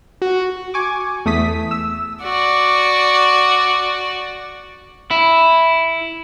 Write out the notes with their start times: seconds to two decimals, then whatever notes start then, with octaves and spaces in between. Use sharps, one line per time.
0.22 F#4
0.74 G#5 C#6 D6
1.25 E2 A3 D#6 B6
1.71 E6
2.23 F#4 D5
5.11 E4